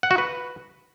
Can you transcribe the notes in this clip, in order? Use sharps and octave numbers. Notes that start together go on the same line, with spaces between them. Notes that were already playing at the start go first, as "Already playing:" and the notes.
F#5
F#4
B4